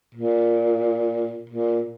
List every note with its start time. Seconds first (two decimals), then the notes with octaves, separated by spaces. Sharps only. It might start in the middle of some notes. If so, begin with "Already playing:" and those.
0.15 A#2
1.50 A#2